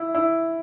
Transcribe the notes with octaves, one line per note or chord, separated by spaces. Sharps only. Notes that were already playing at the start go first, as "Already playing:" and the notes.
Already playing: E4
E4